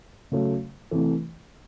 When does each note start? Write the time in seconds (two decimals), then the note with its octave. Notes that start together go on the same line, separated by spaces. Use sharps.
0.32 C#3 F#3 A3
0.91 C3 E3 A3